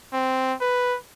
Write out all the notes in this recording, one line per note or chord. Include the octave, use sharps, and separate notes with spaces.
C4
B4